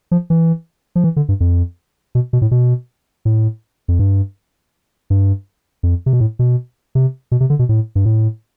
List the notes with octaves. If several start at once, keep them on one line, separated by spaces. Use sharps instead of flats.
F3
E3
F3
E3
D3
G2
F2
B2
B2
A2
B2
A2
F2
G2
G2
F2
C3
B2
A2
B2
C3
B2
C3
D3
B2
A2
G2
A2